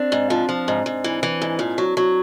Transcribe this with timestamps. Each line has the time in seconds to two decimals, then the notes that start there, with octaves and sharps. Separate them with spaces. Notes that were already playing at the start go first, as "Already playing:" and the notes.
Already playing: C4 D4
0.12 G#2
0.30 F3
0.49 F3
0.68 G#2
0.86 G#2
1.04 E3
1.23 E3
1.42 G#2
1.59 A#2
1.78 F#3
1.97 F#3